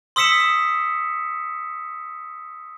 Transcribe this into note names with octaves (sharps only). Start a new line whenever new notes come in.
C6 D#6 E6 B6 C#7 E7